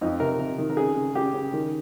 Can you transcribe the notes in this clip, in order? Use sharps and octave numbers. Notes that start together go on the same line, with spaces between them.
F2 D#4
C3 A#4
C3
D#3
A#4
C#3 G#4
C#3
C#3 G4
C#3
D#3